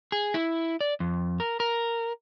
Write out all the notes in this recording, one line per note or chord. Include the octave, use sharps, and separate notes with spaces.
G#4
E4
D5
F2
A#4
A#4